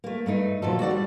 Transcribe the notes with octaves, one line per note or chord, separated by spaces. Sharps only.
A3 A#3
G2 A3 D#4
A#2 D#3 F3 F#3 A4
F#4 A4 D5 F#5
G3